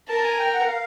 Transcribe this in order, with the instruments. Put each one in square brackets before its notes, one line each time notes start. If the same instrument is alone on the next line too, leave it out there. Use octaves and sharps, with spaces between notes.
[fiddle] A#4 [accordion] A5
[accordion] G#5
G5
F#5
F5